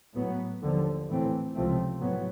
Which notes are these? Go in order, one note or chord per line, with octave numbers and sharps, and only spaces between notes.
A2 F#3 B3
D#2 D3 F3
A2 E3 A3 C4
C#2 C3 F3 A3 C4
A2 F#3 B3